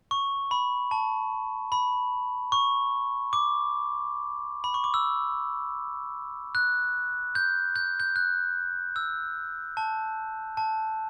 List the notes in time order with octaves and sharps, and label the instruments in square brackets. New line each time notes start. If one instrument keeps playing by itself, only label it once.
[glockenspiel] C#6
B5
A5
B5
C#6
D6
B5
C#6
D6
E6
F#6
G6
G6
G6
F#6
E6
A5
A5